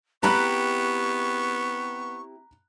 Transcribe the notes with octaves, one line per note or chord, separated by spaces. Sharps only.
B3 C4 E4 G4 A#5 B5 C#6 F#6